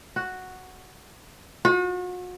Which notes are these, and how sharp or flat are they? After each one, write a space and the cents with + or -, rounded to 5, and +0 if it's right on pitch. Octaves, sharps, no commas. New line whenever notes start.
F#4 +0
F#4 -40